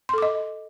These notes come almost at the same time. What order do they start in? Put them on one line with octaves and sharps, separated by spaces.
C6 A4 D6 D#5